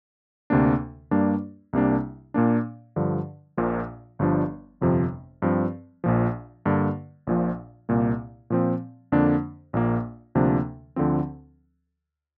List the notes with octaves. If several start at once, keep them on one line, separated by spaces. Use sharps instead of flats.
D2 C3 A#3 D4
G2 G3 A#3 D4
C2 C3 G3 A#3 D4
A#2 A#3 D4
G2 D3 F3
A#1 A#2 F3 A#3
G1 G2 F3 D4
G1 F2 C3 F3
G2 F3 C4
A#1 A#2 F3
G2 D3 A#3 D4
A#1 A#2 F3
C2 A#2 A#3
A#2 F3 C4
F2 D3 A#3 D4
A#1 A#2 A#3
D2 C3 F3 A#3 D4
D2 D3 F3 C4